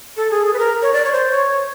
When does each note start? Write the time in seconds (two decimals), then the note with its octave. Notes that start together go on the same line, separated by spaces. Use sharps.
0.17 A4
0.31 G#4
0.46 G#4
0.53 B4
0.59 A#4
0.82 C#5
0.93 D5
1.05 C#5
1.13 C5
1.31 C#5